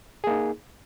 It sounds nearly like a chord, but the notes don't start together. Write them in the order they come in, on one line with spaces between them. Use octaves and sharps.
G#4 A#3 D#4